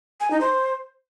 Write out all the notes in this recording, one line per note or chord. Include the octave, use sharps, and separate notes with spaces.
G#5
D#4
C5